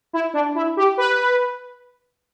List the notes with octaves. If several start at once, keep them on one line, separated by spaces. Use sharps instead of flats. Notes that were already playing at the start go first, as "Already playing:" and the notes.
E4
D4
E4
G4
B4